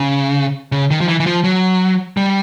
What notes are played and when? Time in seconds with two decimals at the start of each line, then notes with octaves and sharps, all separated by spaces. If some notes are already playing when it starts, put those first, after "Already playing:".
Already playing: C#3
0.72 C#3
0.91 D#3
1.01 F3
1.08 E3
1.20 E3
1.26 F3
1.44 F#3
2.17 G3